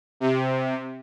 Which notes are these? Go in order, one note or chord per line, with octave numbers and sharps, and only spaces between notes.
C3